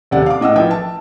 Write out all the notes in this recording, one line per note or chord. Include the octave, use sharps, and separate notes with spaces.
D#2 C3 D5 F#5
F5 D6
A2 D#5 F#5 E6
A#1 E3 E5 G5
A5